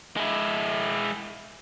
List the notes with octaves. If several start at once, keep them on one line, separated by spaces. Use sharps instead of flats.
G#3 E4